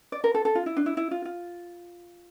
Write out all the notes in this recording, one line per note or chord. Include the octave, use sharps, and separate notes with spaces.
D5
A#4
A4
A4
F4
E4
D4
E4
E4
F4
F4